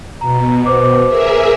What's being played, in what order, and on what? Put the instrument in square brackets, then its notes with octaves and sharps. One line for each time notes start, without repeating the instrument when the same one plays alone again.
[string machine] B2 [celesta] A#5
[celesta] B4 C5 D6
[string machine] G#4 A#4 E5